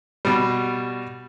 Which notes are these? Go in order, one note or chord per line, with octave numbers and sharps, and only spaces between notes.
B2 G3